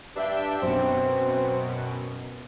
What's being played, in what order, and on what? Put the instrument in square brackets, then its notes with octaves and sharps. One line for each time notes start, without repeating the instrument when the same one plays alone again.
[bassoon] G2 [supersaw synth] D4 E5 G5
[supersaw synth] F#2 B2 [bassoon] C4